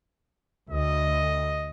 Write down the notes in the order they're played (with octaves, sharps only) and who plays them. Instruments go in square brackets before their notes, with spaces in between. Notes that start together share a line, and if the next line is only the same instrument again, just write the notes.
[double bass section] D2 [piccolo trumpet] D#5